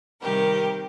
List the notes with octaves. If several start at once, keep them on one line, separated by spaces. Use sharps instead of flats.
C3 D#3 G3 G4 A#4